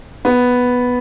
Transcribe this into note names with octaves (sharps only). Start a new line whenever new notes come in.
B3